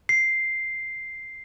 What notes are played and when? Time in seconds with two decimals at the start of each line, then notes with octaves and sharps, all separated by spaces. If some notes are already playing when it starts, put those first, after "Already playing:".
0.09 C7